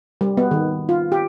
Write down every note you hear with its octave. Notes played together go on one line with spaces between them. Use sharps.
G3
B3
D#3
F4
G4